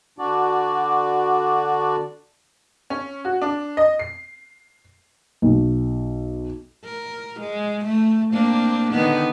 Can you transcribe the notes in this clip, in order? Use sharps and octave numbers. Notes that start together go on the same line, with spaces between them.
D3 D4 F#4 D5
C#4
F#4
D4
D#5
C7
B1
A#4
G#3
A3
A#3 C4 D4
D3 D#3 B3